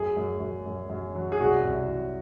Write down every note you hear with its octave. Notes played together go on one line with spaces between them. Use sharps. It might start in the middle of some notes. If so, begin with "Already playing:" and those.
Already playing: F#2 G#4
F#2
F#2
F#2
F#2
F#3
G#4
C2 F#4
C2
F#3